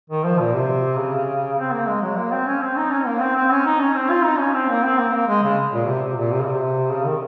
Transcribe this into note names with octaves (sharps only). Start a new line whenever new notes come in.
D#3
F3
A#2
C3
C#3
C4
A#3
G#3
F#3
A#3
C4
C#4
C4
D#4
C#4
A#3
C4
C4
C#4
D#4
C#4
C4
F4
D#4
C#4
C4
A#3
C4
A#3
A#3
G#3
C#3
A#2
C3
C3
A#2
C3
C#3
C3
C#3
D#3